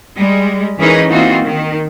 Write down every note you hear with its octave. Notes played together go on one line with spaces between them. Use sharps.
G3 G#3
E3 C#4 D#4 G#4 A#4 B4
E3 A#3 C4 D#4 F4 F#4
D#3